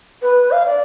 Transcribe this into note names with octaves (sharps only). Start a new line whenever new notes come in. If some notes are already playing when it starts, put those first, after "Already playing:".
B4
F5
D5